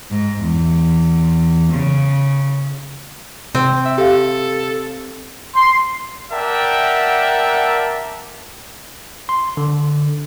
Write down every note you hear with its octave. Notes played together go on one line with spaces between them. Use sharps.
G#2
E2
C#3
C3 C4
E5
G4 A4 F5
C6
A#4 D5 E5 F#5 G5 A5
C6
D3